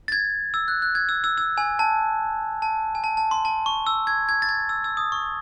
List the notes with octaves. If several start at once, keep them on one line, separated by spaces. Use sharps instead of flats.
A6
G#6
E6
F#6
F#6
G#6
E6
E6
E6
G#5
A5
A5
G#5
A5
A5
C6
A5
C#6
E6
G#6
G#6
A6
G#6
E6
E6
D#6
C#6